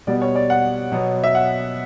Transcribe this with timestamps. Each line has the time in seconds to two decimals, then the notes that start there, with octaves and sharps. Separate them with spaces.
0.07 B2 G3 B3 D5
0.22 C#5
0.35 D5
0.50 F#5
0.92 B2 F#3 B3
1.24 E5
1.35 F#5